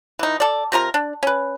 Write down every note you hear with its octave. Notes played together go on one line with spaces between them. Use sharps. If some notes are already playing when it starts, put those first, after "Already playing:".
E3 D#4
A4 D5
C3 F4 A#4 A#5
D4
C#4 B4